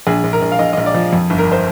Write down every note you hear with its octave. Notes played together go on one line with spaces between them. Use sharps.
A#1 G#4
A#1
A#4
A#1
F5
A#1 D#5
D#5
A#1
D5
F3
F2
G1
A#4
C5